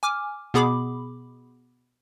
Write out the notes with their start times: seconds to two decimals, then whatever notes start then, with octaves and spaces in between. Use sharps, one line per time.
0.03 G#5 D6 F6
0.54 B2 B3 G#4 B5 D6